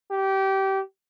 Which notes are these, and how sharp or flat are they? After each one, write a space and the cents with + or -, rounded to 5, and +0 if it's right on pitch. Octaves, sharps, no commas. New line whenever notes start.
G4 -20